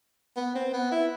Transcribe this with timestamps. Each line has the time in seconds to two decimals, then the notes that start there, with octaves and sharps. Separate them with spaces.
0.36 B3
0.55 C4
0.73 B3
0.92 E4